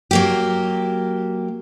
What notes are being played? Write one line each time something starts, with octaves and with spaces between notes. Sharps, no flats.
F#3 A#3 G4